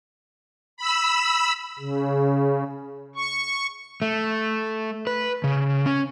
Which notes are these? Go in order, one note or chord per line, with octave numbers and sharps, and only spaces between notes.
B5 E6
C#3
C#6
A3
B4
C#3
C#4